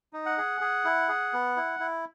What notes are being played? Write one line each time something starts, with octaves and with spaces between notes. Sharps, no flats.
D#4
F#5
G#4
G#4
E4
G#4
B3
E4
E4